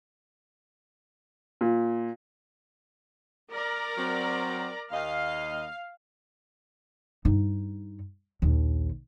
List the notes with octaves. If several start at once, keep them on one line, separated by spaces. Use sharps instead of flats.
A#2
A#4 D5 A#5
F#3 C4
D#2 D#5 F5
G2 D#4
A#1 D#2